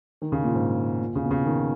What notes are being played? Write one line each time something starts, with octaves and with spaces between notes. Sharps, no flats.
D#3
C#3
A#2
G#2
A#2
C#3
B2
C#3
D#3